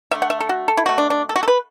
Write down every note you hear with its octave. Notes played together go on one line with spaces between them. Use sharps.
D3 A3 E5
F#5
E5
A4
F#4
A4
E4
B2 A3 F#4
D4
D4
A4
F#4
A4
B4